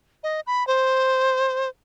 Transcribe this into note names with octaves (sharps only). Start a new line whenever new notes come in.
D#5
B5
C5